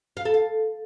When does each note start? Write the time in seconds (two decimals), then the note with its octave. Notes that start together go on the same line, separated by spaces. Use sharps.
0.17 F5
0.25 A4
0.34 F5